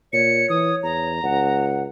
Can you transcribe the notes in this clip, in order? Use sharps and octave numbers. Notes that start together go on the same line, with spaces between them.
A#2 C#5 C#7
E3 D#6
E2 A#5
C#2 F#5